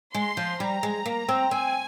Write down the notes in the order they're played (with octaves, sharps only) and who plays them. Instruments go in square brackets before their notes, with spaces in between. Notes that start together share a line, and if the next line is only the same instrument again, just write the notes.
[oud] G#3 [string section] C6
[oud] F3
[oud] G3 [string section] A#5
[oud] G#3
A#3
C4
[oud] C4 [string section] G#5